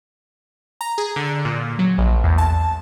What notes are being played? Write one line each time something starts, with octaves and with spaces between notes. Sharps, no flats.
A#5
G#4
D3
A#2
F#3
A#1
E2
A5